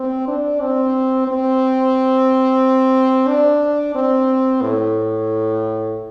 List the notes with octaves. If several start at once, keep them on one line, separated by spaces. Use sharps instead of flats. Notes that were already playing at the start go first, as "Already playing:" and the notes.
Already playing: C4
D4
C4
C4
D4
C4
A2